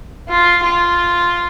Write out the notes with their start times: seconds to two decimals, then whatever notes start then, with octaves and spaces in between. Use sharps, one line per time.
0.28 F4
0.63 F4